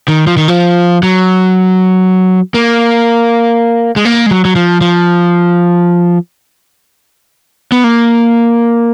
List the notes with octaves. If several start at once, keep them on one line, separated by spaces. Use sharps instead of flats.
D#3
F3
D#3
F3
F#3
A#3
G#3
A#3
G#3
F#3
F#3
F3
F3
B3
A#3